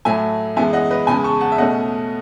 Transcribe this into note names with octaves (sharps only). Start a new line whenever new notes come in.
A2 F#3 A3 E5 G#5
F#2 E3 G#3 B3 E5 G#5
D#5 F#5
B4 D#5
E2 C#3 G#3 G#5 B5
A5 C#6
F#5 A5
E5
B2 A3 C#4 D#5 F#5